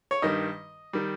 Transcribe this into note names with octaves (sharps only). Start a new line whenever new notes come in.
C#5
G2 D#3 G3 D#5
D#3 G3